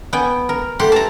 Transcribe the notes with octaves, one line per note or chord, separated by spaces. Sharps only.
B3 G5 G#5
A#4
E3 A3 G4 F#5 C6
E3 A5 A#5